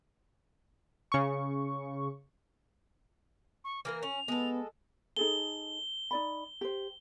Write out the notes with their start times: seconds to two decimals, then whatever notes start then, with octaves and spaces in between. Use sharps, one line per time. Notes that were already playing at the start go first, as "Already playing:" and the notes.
1.12 C#3 C#6
3.64 C#6
3.85 E3 A#3 A#4 F6
4.03 C#4 F7
4.28 G#3 B3 A4
5.17 D#4 G#4 A4 G7
6.11 D#4 D5 B5
6.61 G4 C5